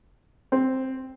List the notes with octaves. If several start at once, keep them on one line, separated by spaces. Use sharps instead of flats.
C4